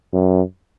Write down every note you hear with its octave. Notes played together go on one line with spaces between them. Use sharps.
F#2